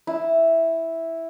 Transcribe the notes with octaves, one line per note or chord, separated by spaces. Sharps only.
E4